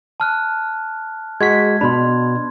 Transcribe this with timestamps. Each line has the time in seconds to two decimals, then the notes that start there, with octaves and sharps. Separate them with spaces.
0.20 A5 F6 F#6
1.41 G#3 F#4 G#6 B6
1.81 B2 D4 B5 C6